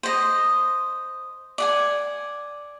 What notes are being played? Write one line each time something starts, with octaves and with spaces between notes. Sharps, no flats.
C5 D#5
D5 F#5 G#5